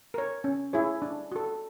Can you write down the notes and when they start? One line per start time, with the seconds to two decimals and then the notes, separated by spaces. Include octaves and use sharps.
0.14 A#4 C#5
0.44 C#4
0.73 E4 G#4 C#5
1.02 D4
1.32 F#4 A4